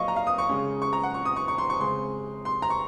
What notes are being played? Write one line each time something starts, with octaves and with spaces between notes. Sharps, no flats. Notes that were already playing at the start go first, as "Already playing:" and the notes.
Already playing: A#2 F#3 D#5 F5 C#6
A#5
F5
D#6
C#6
C#3 G#3 C#4
C#6
A#5
F#5
C#6
D#6
C#6
C#6
C6
C#6
C#3 G#3 C4 C6
C6
A#5
C#6